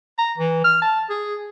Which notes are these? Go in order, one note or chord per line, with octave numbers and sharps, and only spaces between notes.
A#5
E3
F6
A5
G#4